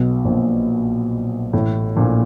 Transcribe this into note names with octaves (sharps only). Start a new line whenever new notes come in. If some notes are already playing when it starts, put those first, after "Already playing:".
Already playing: B1 B2
A#1 A#2
A1 A2
A#1 A#2